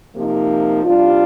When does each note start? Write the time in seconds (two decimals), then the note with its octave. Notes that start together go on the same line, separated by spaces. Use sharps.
0.14 C3 F3 A#3 D#4
0.84 C3 G3 D4 F4